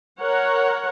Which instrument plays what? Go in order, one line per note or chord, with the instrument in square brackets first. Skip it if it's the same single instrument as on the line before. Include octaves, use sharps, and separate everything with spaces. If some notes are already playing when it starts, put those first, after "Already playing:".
[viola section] A#4 C#5 F#5